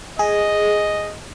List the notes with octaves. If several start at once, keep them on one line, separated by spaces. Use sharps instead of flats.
G#4 D#5